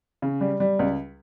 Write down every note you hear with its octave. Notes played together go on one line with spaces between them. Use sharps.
C#3
G3
G3
C#2